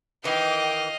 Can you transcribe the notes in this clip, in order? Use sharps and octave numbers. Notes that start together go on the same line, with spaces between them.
D#3 E3 D#5 F5 G5 D6